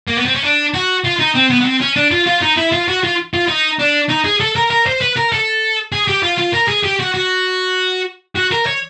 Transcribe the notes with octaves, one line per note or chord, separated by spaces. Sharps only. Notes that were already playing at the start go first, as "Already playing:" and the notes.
A#3
B3
C4
C#4
D4
F#4
F4
D#4
C4
B3
B3
C4
C#4
D4
F4
F4
D#4
E4
F4
F#4
F4
F4
D#4
D4
D#4
G#4
A4
A#4
A#4
C5
B4
A#4
A4
G#4
G4
F4
F4
A#4
G#4
G4
F#4
F#4
F#4
A#4
C#5